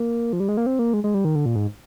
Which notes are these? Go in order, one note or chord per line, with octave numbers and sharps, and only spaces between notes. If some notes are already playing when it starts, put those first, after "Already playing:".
Already playing: A#3
F3
G3
G#3
A#3
C4
A#3
G#3
G#3
G3
D#3
D3
A#2
G#2